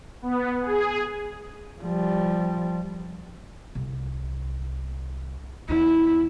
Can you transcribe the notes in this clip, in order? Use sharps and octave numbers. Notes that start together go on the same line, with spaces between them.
B3
G#4
F3 G3
C2
E2 E4